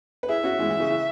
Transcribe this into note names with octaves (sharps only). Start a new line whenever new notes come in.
B4
E4 G#4 E5
C#4 F#4
E3 G#3
E3
C#3
E3